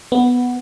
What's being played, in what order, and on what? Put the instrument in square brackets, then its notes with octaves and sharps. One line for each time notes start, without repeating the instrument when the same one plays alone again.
[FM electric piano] B3